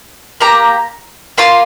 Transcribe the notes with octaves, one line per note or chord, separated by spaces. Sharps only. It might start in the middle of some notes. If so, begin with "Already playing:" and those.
A#3 G4 A#5
A#3 F4 C6